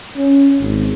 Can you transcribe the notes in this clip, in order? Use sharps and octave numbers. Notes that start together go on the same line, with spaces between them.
C#4
G#1